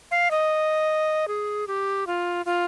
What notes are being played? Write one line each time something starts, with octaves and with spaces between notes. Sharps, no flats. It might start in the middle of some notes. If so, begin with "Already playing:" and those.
F5
D#5
G#4
G4
F4
F4